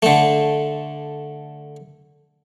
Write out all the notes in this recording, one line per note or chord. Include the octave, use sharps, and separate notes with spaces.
D3 A3